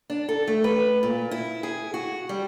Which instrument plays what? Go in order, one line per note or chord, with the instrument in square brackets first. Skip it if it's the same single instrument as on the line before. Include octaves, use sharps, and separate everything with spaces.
[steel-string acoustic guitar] D4
A4
A3
B4
A#2
E4
G#4
F#4
G3